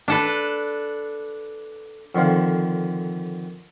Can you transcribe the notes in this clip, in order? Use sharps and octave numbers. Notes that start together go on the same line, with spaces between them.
D4 A4 B4
F2 D3 D#3 C5 F5